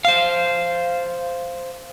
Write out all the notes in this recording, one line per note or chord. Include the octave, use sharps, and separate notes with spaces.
C5 F5